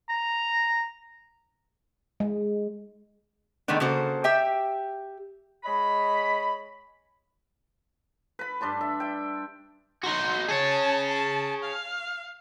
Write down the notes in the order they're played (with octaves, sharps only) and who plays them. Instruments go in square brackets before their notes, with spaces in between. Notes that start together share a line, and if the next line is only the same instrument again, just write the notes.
[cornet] A#5
[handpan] G#3
[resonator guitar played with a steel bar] D#3 G#3 A3 B3 D4
C#3 A#3 F#4 A4 C5
G4 E5 G5
[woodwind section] G#3 C#5 D#5 B5
[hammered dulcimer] B4 B5
G2 D4 A5 C6
E5
E5 G5
[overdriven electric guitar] D#4 F#4 [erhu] C6
[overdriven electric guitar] G#4 C#5 [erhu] A5
[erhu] A5
F5